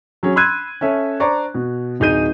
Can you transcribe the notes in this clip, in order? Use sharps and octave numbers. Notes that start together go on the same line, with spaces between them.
F#3 C#4 G#4
B5 C6 E6 F#6 G#6 D#7
C#4 A4 E5
D4 C5 D5 A#5 C#6
B2
D1 D#4 G#4 G6 D#7